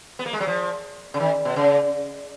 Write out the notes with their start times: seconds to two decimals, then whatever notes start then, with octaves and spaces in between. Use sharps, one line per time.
0.19 B3
0.26 A#3
0.33 G#3
0.40 F#3
0.47 F3
1.14 C#3
1.20 D#3
1.45 B2
1.56 C#3